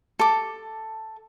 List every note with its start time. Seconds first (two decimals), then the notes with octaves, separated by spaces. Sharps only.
0.19 A4 D6